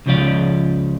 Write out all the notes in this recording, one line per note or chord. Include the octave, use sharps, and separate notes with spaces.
C#2 C#3 F3 C#4 D5 F5